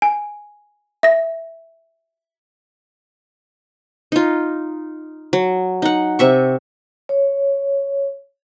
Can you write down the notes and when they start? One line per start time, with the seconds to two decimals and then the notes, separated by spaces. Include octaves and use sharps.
0.02 G#5
1.03 E5 A#6
4.12 D#4 F4
5.33 F#3
5.82 D#4 F#5
6.19 C3 E5 C#6
7.09 C#5